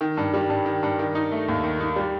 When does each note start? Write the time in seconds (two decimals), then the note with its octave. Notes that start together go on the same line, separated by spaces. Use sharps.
0.01 D#3
0.17 G2
0.34 G3
0.49 G2
0.65 D#3
0.83 G2
0.99 D#3
1.15 D#4
1.32 A3
1.48 D#2
1.64 D#3
1.80 D#4
1.96 G3